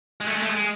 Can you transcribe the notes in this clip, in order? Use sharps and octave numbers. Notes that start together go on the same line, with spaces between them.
G#3
A3
G#3
A3
G#3